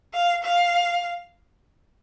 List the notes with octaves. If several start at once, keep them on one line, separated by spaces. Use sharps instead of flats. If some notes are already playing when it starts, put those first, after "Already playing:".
F5
F5